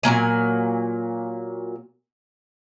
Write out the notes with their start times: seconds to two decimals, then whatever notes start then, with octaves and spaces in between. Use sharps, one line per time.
0.03 A#2 F#3 A#3 G#5